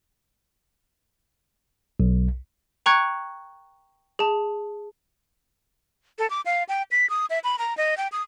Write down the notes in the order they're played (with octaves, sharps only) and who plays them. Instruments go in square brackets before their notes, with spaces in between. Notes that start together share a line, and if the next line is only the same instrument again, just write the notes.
[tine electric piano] B1
[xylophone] G5 A#5 C#6 F#6 G#6 C#7
G#4 A5
[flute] A4
D6
F5
G5
B6
D#6
E5
B5
A#5
D#5
G5
D#6